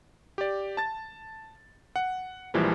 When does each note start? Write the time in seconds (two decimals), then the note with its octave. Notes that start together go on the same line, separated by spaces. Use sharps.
0.38 G4 D5
0.77 A5 A6
1.96 F#5
2.54 A#1 E3 F3 G3 G#3 A#3